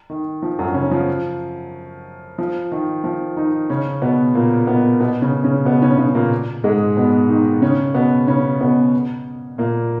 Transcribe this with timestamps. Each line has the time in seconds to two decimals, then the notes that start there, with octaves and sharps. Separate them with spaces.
0.10 D#3
0.42 F3
0.59 F#2 F#3
0.74 C#3 C#4
0.91 F3
2.38 F3
2.72 D#3
3.04 F3
3.37 D#3 D#4
3.70 C#3 C#4
4.02 B2 B3
4.35 A#2 A#3
4.67 B2 B3
5.00 B2 B3
5.22 C#3 C#4
5.44 C#3 C#4
5.65 B2 B3
5.82 C#3 C#4
5.98 C#3 C#4
6.15 A#2 A#3
6.64 G#2 G#3
6.97 B2 B3
7.29 D#3 D#4
7.62 C#3 C#4
7.95 B2 B3
8.28 C#3 C#4
8.61 B2 B3
9.58 A#2 A#3